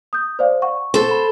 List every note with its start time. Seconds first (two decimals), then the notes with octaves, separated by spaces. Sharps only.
0.13 D#6 G6
0.39 C5 D5 F5
0.62 F#5 C#6
0.94 A4 C5
1.11 B5